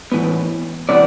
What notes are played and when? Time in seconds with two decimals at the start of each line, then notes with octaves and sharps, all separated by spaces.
0.12 A2 E3 B3
0.89 C3 E3 B3 D5